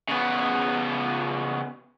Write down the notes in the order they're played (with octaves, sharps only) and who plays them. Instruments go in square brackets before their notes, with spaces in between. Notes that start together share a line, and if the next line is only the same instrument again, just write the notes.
[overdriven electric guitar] C#3 B3